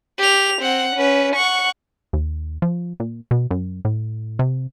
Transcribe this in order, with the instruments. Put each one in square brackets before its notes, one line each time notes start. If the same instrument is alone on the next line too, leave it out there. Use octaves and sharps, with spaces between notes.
[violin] G4 F7
C4 F#5
C#4 B4
F#5 C#6
[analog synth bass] D#2
F3
A#2
B2
F#2
A2
C3